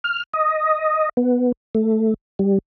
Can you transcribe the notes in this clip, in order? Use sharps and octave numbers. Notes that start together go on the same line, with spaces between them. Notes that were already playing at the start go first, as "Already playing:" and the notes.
F6
D#5
B3
A3
G3